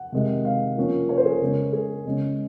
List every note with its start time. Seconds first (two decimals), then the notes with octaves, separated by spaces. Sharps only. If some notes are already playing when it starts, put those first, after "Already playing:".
Already playing: F#5
0.12 C3 D#3 G#3
0.45 F5
0.77 F3 A#3 C#4
1.09 C#5
1.17 C5
1.25 G#4
1.33 A#4
1.41 C#3 G#3 C#4
1.73 G#4
2.05 C#3 G#3 C#4